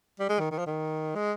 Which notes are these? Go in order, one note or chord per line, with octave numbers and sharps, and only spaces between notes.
G3
G#3
D#3
D#3
F3
D#3
G#3